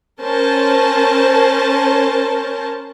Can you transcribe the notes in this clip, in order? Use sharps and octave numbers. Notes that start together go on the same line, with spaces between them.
C#4 A#4 C5 A5